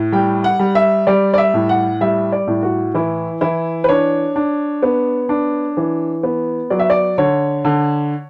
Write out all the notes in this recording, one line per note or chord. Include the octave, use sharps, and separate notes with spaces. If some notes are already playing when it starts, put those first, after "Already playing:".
Already playing: A2
G3 G5
F#5
G3
E5
G3 D5
D5
E5
A2
F#5
G3 E5
D5
A2
F#4
E3 E4
E3 E4
B4
D4 C#5
D4
B3
D4
E3
B3
F#3 D5
E5
D5
D3 C#5
D3